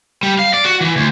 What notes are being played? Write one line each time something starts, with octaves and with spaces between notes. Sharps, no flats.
G3
F5
D5
F#4
E3
D2